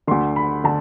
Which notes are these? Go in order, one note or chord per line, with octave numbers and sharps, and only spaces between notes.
D2 D3 C6
B5
D3 A5